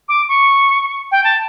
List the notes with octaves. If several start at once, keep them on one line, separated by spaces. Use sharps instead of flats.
D6
C#6
G5
A5